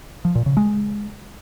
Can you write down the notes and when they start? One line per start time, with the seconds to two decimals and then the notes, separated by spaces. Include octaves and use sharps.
0.25 F3
0.35 A#2
0.46 C#3
0.57 G#3